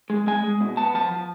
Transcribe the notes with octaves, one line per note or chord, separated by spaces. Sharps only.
G#3
G#3 G#5
G#3
B2
B3 A5
F3 A5
F3